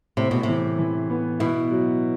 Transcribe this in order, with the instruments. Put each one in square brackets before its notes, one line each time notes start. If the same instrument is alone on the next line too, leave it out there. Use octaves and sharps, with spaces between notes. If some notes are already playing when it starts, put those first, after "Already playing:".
[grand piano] A2 [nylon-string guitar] C3
[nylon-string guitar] B2
[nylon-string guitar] C3 [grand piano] E3
[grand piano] E3
B3
[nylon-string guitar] B2 [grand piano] E4
[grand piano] F#3